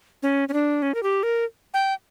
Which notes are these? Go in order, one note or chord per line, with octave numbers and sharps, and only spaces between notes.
C#4
C#4
D4
C#4
A#4
G4
A#4
G5